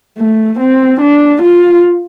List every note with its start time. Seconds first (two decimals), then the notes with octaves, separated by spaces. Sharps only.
0.19 A3
0.60 C4
1.01 D4
1.42 F4